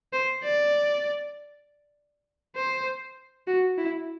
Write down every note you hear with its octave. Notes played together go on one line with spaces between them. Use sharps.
C5
D5
C5
F#4
E4